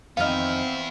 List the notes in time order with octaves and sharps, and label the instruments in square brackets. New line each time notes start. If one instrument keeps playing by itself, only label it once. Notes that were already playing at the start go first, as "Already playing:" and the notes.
[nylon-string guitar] F2 D#3 D#5 [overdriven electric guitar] B3 E4 [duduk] C4 [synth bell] F5 F6